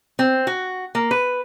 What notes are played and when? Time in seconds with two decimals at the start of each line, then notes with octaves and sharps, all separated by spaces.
0.19 C4
0.47 F#4
0.95 A#3
1.11 B4